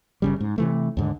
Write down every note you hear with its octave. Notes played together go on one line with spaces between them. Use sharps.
G1 C#3 G3
G#2
C3 E3 A3
D#2 G#2 D3